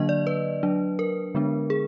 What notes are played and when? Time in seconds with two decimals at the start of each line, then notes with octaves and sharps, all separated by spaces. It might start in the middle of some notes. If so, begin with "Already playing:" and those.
Already playing: D3 F#3 A#3 D4 D#5
0.09 D5
0.27 B4
0.63 F#3 D4
0.99 A#4
1.35 D3 G#3 B3 D4
1.70 G#4